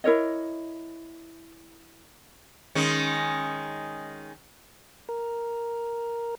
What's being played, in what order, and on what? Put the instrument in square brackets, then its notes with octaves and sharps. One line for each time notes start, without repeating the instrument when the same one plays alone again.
[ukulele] E4 A#4 C#5 D#5
[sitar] D#3 G#3 C#4
[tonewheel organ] A#4